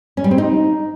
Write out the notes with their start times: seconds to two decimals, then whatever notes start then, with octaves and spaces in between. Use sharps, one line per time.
0.17 C#4
0.24 G3
0.31 C4
0.38 D#4